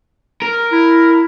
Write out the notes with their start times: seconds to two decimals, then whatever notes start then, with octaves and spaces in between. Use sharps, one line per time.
0.42 A#4
0.72 E4